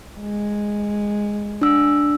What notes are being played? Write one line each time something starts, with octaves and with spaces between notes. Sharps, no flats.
G#3
D4 E6